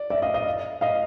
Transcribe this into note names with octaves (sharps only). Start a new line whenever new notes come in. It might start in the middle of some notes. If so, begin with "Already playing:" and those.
Already playing: D5
D5 E5
D#5 F5
D#5 F5
D#5 F5